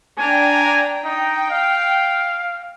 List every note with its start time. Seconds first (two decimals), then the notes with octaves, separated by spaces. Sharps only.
0.18 D4 G5 G#5 A#5
1.04 D#4 G5
1.50 F5